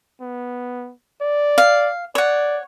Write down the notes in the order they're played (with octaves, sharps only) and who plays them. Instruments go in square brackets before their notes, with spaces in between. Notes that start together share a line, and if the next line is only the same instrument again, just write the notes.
[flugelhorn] B3
D5
[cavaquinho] F5
[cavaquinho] C#5 F#5 [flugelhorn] D5